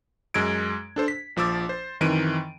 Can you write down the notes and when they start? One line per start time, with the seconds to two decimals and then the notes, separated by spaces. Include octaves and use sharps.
0.34 F#2 G#3 E6 G#6 D7
0.96 D4 A4 C5
1.08 B6
1.36 A#1 F3 D6 E6 A6
1.69 C5
2.01 F#2 D#3 E3 C4 D7 D#7